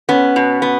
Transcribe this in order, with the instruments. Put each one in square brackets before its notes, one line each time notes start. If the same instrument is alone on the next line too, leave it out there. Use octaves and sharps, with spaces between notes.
[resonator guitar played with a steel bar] B3 [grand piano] C#4
[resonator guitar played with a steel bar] B2
B3